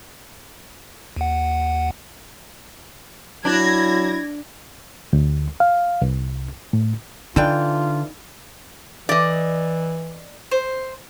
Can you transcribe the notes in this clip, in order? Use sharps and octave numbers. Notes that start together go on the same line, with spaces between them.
D#2 F#5
F#3 D4 E4 G#6 A#6
D2
F5
C2
A2
D3 E3 D4 D#4 F4 G5
E3 D5 D#5
C5